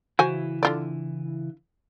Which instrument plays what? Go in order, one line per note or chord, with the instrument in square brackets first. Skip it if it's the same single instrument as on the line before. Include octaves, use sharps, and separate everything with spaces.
[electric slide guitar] C#3 E3 E4 [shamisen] F#4 C5 G#5
[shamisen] D3 F4 D5